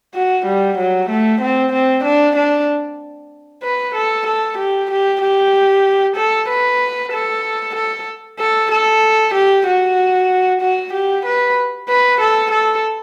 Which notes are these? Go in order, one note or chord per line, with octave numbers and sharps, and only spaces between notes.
F#4
G3
F#3
A3
C4
C4
D4
D4
B4
A4
A4
G4
G4
G4
A4
B4
A4
A4
A4
A4
G4
F#4
F#4
G4
B4
B4
A4
A4